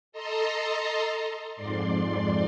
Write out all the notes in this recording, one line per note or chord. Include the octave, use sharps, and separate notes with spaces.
A4 D#5 A5 A#5 C6
F2 G#2 D5 C6